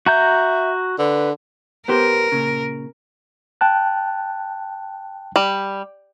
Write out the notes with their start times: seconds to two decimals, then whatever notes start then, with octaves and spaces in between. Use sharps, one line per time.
0.06 F#4 E5 A#5 G6
0.99 D3 B4
1.88 B3 G4 A#4 C5
2.32 A#2 C#3
3.61 G5 A5 F#6
5.36 G3